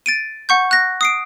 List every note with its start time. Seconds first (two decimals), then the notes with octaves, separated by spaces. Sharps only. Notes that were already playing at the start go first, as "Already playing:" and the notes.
0.06 A6 D7 D#7
0.49 F#5 C#6 G6
0.71 F#6 A#6
1.01 D#6 C7 D7